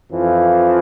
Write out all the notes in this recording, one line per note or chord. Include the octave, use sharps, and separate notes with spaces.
F2 E3 F3